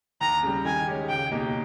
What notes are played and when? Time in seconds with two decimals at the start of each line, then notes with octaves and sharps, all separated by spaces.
0.21 D#2 A#5
0.43 C#3 G3
0.65 D#3 G#5
0.87 G#3 C#4 G4
1.09 C#2 G5
1.32 B2 A#3 D#4 G4